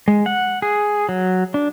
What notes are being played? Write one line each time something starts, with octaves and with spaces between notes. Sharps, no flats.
G#3
F#5
G#4
F#3
D4